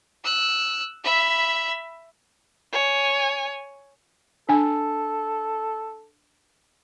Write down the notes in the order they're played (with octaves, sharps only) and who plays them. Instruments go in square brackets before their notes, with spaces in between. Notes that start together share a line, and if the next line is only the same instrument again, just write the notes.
[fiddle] E6 F#6
E5 B5
[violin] C#5 G#5
[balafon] D4 G#5 [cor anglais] A4